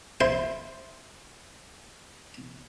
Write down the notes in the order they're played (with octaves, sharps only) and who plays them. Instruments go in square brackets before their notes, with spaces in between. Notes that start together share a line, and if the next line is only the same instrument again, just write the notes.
[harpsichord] E4 C5 C6